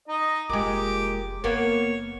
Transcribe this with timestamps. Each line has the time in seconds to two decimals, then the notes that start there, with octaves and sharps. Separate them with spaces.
0.08 D#4 D#5
0.50 F1 A#2 G#3 G4 D6
1.44 F#1 A#3 B3 C#5